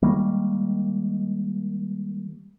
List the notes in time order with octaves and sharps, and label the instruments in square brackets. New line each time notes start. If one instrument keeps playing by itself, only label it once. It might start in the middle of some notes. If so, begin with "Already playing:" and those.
[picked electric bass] D#3 G3 G#3 A#3